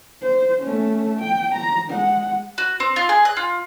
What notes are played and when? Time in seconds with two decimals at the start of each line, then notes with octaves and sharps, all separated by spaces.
0.22 C5
0.63 A3 C#4
1.20 G5
1.55 A#5
1.88 G#3 F#5
2.58 F#4
2.80 C4
2.96 F4
3.09 G#4
3.25 F#6
3.37 F4